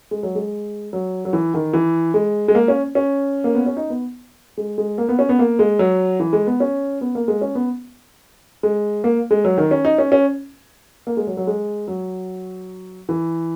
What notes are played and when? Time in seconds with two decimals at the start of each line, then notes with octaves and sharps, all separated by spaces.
0.11 G#3
0.23 F#3
0.35 G#3
0.93 F#3
1.25 F#3
1.33 E3
1.54 D#3
1.73 E3
2.14 G#3
2.48 G#3
2.55 A#3
2.68 C#4
2.95 C#4
3.44 A#3
3.55 B3
3.66 C#4
3.77 D#4
3.90 B3
4.57 G#3
4.78 G#3
4.98 A#3
5.09 B3
5.19 C#4
5.29 B3
5.39 A#3
5.59 G#3
5.79 F#3
6.20 E3
6.33 G#3
6.47 B3
6.60 C#4
7.01 B3
7.15 A#3
7.28 G#3
7.41 C#4
7.55 B3
8.63 G#3
9.04 A#3
9.31 G#3
9.45 F#3
9.58 D#3
9.71 C#4
9.85 D#4
9.98 C#4
10.12 C#4
11.07 A#3
11.17 G#3
11.27 F#3
11.37 F#3
11.47 G#3
11.88 F#3
13.09 E3